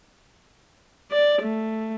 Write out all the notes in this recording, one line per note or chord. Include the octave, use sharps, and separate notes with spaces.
D5
A3